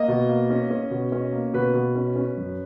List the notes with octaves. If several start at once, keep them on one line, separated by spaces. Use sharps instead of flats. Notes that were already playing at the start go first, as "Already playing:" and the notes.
Already playing: A#3 D#5
B2
A#3
C#4
C#4
B2
C#4
A#3
B2 B4
B2
C#4
C#4
F#2